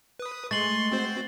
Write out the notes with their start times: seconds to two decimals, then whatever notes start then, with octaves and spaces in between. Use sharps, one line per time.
0.19 B4 D#6
0.51 G#3 A3 C6 C#6 A6 F#7
0.92 C4 F#4 C5